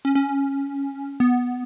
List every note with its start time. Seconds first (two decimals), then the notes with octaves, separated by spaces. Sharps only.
0.05 C#4
0.15 C#4
1.20 B3